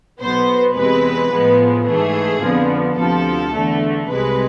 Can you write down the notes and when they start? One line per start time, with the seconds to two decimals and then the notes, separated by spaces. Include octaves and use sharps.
0.21 B1 B2 B3 C5
0.76 E2 C3 G#3 C4 B4
1.32 A2 F3 G#3 B3
1.87 G#2 E3 A3 G#4
2.42 F2 D3 F3 B3
2.98 D2 C3 F3 A4
3.54 E2 D3 A3
4.09 C2 C3 G#3 B4